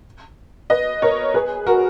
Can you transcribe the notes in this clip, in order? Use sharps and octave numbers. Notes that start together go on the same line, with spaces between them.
B4 D#5
A#4 C#5
G#4 B4
F#4 A#4